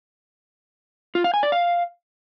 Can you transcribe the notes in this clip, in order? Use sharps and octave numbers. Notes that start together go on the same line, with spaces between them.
F4
F5
G#5
D5
F5